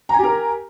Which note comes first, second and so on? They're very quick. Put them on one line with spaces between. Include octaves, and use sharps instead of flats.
A#5 G#5 G4 A#4